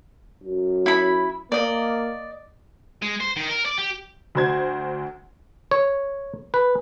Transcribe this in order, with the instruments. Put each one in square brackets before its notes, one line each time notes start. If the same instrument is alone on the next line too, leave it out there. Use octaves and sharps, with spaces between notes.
[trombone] F#2
[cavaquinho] E4 B5
[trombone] A#3 [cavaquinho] D5 D#5
[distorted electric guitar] G#3
C5
D#3
A#4
D5
G4
[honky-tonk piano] D2 F#4 C5 G#6
[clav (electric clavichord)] C#5
B4